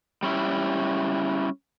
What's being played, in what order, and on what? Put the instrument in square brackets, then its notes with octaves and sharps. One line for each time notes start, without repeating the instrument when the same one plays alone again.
[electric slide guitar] G3 C#4 E4